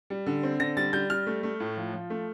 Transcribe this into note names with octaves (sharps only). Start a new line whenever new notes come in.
G3
D3
C4
D3 A#6
G3 A6
G3 G6
G3 F6
A3
A3
A2
F3
F3
A3